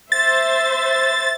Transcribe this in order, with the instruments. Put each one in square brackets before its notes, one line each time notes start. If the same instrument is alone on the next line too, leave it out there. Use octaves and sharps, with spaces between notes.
[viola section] C5 E5 [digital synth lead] A6